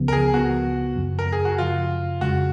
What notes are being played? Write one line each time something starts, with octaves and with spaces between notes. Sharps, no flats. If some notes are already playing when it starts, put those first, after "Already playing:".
Already playing: C#2 C#3 F3 B3
A#4
G#4
C#2 C#3 F3 B3 F#4
F#2 C#3 F3
A#4
G#4
F#4
F#2 C#3 F3 F4
F2 C#3 F3 G#3 F#4